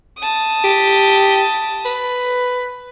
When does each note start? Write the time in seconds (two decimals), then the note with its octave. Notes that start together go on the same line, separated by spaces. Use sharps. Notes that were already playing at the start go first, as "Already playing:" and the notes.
0.18 A5 D#6
0.64 G4
1.85 B4